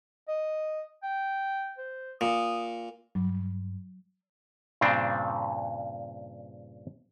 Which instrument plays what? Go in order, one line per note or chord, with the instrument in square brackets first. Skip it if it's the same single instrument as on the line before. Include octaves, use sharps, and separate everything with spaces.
[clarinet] D#5
G5
C5
[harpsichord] A#2 [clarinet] D#6
[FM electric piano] G2 [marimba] F#3
[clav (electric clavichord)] G2 A#2 C#3 C4 D4